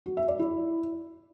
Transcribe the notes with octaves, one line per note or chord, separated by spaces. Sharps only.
F#4
E5
D5
E4